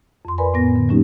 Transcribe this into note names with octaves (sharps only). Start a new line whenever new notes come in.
F2 C6
A#4 B4 D5 G#5 B5 C6
A2 B3 A#6
D3
F#3 A#3 C#4 D#4 G4